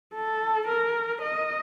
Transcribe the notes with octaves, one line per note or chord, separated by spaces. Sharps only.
A4
A#4
D#5